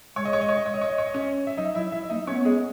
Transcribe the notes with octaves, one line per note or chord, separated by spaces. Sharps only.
G#3 C#5
D#5
C#5
D#5
C#5
D#5
C#5
D#5
C#5
D#5
C#5
D#5
C#4 C#5
E5
F#3 D#4 D#5
F#3 E4 E5
F#3 E4 E5
A#3 D#4 D#5
B3 C#4 C#5
G#3 G#4